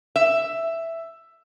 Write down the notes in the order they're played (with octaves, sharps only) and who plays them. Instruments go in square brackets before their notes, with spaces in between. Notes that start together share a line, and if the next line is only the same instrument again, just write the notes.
[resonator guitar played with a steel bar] E5